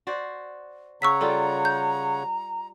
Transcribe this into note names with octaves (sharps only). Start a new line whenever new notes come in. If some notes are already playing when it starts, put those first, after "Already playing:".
F#4 C5 D5
C#3 C#5 F#5 A#5 C#6 E6 B6
G3 F4 A4 G5
G6